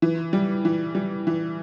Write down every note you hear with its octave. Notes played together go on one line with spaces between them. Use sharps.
E3
G3
E3
G3
E3